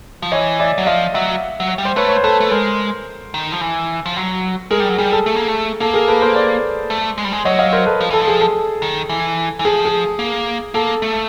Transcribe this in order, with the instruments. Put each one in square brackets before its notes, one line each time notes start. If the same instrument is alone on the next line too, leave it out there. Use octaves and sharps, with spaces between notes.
[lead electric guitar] F3
[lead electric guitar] E3 [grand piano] C#5 D#5
[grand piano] D5 E5
[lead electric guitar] F#3
[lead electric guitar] F3 [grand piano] D#5 F5
[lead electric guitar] F#3 [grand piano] E5 F#5
[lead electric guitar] F#3
G3
[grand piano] C5
[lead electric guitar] A3 [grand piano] B4 C#5
[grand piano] C#5
C5
[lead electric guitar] A3 [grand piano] A4 B4
[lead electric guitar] A3
[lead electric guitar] G#3 [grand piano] A#4 C5
[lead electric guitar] D#3
F3
E3
F3
F#3
[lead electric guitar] G#3 [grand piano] G#4 A#4
[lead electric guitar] G3
F#3
[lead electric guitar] G3 [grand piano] G#4
[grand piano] A4
[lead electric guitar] A3
A#3
A3
[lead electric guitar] A#3 [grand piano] A4
[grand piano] G#4 A#4
A4 B4
A#4 C5
C5 D5
[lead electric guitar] A3
G#3
G3
G#3
[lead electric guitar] F#3 [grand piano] C#5 D#5
[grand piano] D#5 F5
A#4 C5
A4 B4
[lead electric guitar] F3
[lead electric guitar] E3 [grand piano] A4
[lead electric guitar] F3
[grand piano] G#4
A4
[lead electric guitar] D#3
E3
E3
[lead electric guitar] F3 [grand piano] G#4
[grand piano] G#4
[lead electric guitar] A#3
[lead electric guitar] A#3 [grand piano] A4
[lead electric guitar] A3